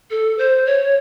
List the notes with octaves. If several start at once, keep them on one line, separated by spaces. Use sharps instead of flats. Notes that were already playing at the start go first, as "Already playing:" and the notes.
A4
C5
C#5